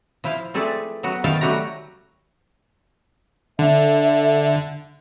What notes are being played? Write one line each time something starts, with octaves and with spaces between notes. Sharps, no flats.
F3 E4 C5 F5
A3 C4 G#4 A4 B4 D5
F#3 B3 F#4
D#3 B3 A4 F5 G5 A5
F#3 G3 A3 F#4 G4 A#5
D3 E5